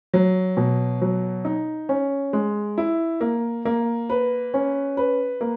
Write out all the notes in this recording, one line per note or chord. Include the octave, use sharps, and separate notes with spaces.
F#3
B2
F#3
D#4
C#4
G#3
E4
A#3
A#3
B4
C#4
B4
A#3